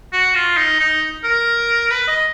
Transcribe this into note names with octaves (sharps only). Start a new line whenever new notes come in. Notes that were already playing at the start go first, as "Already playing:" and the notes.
F#4
F4
D#4
D#4
A#4
B4
D#5